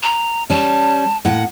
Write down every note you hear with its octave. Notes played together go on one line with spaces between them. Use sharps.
A#5
G3 C#4 A5
A2 A#3 F#5